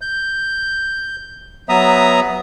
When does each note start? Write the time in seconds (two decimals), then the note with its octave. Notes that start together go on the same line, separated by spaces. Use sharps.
0.01 G6
1.69 F#3 B3 E5 A#5 D#6